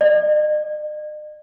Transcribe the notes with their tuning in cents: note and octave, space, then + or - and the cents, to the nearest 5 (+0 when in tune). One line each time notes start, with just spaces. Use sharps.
D#5 -45